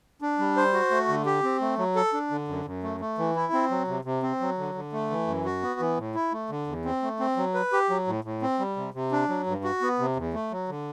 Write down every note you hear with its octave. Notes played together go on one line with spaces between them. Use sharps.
D4
G3
C5
F#4
A3
D3
G4
C4
A3
F#3
A4
D4
D3
F#2
F#2
A3
A3
E3
E4
C4
F#3
C3
C3
C4
F#3
D3
D3
A3
E3
F#2
F#4
B3
E3
A2
E4
A3
D3
E2
C4
A3
C4
F#3
B4
G4
F#3
A2
A2
C4
G3
C3
C3
D4
F#3
G2
F#4
B3
C3
E2
A3
F#3
D3